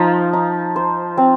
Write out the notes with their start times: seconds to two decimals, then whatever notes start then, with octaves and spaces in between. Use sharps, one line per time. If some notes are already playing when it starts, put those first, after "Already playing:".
Already playing: F3 D#4 C5
0.33 D#4
0.76 C5
1.17 C4